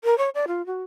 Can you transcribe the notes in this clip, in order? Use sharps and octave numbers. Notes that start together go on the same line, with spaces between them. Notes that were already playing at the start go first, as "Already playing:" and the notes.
A#4
C#5
D5
F4
F#4